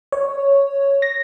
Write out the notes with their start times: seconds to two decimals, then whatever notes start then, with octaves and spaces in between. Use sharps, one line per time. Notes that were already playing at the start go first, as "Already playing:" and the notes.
0.12 C#5
1.02 A#6